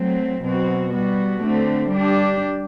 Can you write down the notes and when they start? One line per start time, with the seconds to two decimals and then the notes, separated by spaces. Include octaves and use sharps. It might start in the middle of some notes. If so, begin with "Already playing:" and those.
Already playing: F#3 A3 C4
0.42 B2 F#3 C4 F#4
0.91 G3 B3 F#4
1.40 D3 A3 C4
1.90 G3 D4 G4